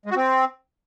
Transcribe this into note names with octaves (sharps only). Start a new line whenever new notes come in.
G#3
F#4
C4